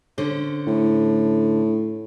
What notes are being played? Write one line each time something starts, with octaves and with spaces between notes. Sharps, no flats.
D3 C#4 C5
A2